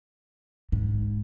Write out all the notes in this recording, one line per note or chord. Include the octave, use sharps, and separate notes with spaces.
G#2